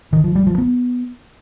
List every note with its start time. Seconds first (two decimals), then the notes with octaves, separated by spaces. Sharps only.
0.13 D#3
0.24 F3
0.35 G3
0.47 F3
0.58 B3